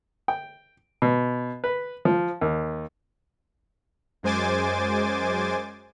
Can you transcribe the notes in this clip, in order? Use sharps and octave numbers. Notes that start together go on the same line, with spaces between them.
G5
B2
B4
F3
D#2
F#2 G#3 C5 G#5 D6 A6